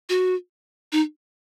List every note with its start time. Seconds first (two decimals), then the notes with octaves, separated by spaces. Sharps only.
0.09 F#4
0.92 D#4